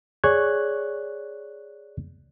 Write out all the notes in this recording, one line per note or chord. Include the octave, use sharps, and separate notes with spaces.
G#4 C#5 D5 C#6 F#6 G#6